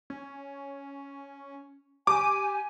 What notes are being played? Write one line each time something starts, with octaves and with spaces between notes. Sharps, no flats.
C#4
G4 G#5 D6